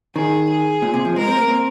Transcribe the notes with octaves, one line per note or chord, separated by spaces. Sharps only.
D#3 G#4
G#4
A#2
C3
F3
G#3 A#4
C4
A#3
C4